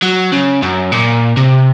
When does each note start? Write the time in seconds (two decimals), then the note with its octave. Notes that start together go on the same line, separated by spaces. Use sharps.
0.03 F#3
0.33 C#3
0.63 F#2
0.92 A#2
1.37 C3